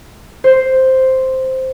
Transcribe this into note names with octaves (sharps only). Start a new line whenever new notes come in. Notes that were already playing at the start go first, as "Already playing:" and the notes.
C5